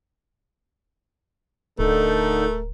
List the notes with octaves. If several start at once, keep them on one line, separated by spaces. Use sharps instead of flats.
D1 D3 A3 D#4 A4 A#4